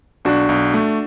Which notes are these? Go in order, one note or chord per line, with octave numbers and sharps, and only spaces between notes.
B1 D4 F#4
B1
A3